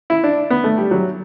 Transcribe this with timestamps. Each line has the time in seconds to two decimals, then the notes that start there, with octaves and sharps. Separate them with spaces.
0.10 E4
0.24 D4
0.50 B3
0.64 A3
0.78 G3
0.91 F#3